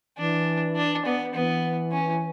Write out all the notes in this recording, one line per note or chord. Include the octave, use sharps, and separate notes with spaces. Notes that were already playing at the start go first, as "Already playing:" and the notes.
E3 D4
D4
B3
E3 B3
C#4